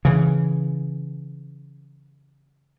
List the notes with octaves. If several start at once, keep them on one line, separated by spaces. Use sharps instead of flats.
C#3 E3